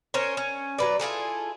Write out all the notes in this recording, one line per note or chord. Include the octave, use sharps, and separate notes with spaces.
C#4 A#4 C5 C#5
C#4
F#3 B4 D5
E4 F4 G#4 A4